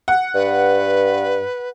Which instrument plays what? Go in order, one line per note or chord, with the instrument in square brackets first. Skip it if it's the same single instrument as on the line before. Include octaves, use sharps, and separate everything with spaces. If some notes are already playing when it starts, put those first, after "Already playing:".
[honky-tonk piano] F#5
[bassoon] G2 [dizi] B4